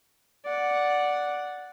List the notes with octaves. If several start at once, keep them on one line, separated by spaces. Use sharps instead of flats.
D5 F#5